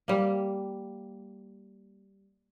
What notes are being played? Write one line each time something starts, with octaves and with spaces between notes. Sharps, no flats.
G3 A#3